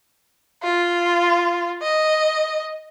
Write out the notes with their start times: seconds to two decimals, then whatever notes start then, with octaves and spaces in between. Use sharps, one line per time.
0.63 F4
1.82 D#5